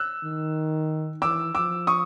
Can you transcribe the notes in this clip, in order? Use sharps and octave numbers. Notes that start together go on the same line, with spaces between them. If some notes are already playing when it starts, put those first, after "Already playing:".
Already playing: E6 F#6
D#3
E3 D6 E6
F3 D6 E6
C#6 D#6